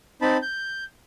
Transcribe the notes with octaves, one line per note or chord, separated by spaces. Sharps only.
C4 D#4 A5 B5
G6